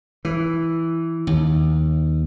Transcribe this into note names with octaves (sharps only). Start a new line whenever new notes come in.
E3
D#2